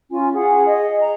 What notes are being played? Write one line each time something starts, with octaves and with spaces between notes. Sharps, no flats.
C#4 F4 G#5
G#4 F#5
D#5
A#5